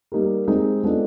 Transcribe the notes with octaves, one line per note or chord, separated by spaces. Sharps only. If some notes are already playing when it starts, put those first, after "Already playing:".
G3 A#3 D#4 G4 A#4
G#3 C4 D#4 G#4
G#3 B3 D4 F4 A4